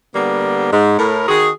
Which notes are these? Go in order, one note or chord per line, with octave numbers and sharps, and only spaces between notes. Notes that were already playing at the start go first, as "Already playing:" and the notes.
D3 G3 A#3 B3
G#2
A2 A#4
D#3 F#4 G#4